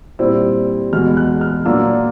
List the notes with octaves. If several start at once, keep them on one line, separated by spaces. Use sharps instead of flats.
A#2 G3 C4 E4 E6
E2 B2 G#3 F6
F#6
F6
A#2 F#3 A#3 D4 F4 E6